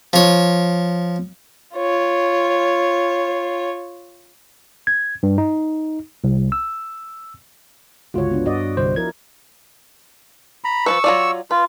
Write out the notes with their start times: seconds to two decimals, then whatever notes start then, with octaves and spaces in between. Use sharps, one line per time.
0.13 F3 C#5
1.76 F4 C#5
4.87 G#6
5.23 G2
5.38 D#4
6.24 C2
6.52 E6
8.14 G1 C#2 F4 F#4 C#5
8.31 B3 D4
8.46 G2 F#4 D5 D#5
8.77 G1 C2 C5
8.96 F3 E4 A#4 G#6
10.64 A#5 B5
10.86 F3 A#3 B4 C#6 E6
11.04 F#3 F4 D5
11.51 F4 B4